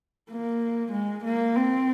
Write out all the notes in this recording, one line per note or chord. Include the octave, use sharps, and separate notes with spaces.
A#3
G#3
A#3
C4